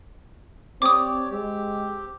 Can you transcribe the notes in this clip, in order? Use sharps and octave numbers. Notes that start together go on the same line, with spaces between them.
C4 G4 C#5 D5 D6 D#6
G#3 C4 G4